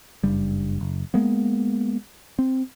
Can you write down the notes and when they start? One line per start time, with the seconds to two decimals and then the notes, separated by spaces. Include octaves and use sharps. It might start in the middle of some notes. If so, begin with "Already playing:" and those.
0.23 F#1 G2 G3
0.81 F#1
1.14 G#3 A#3 B3
2.39 C4